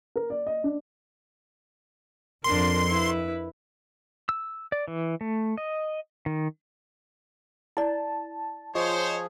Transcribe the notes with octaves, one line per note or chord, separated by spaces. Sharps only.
A#4
D5
D#5
D4
F2 D4 A#4 C6
E4 B4
E6
D5
E3
A3
D#5
D#3
E4 D5 A5
F3 F4 G#4 C5 C#5 D#5